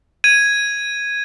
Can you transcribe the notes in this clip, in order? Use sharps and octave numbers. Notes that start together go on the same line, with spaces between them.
G#6 D#7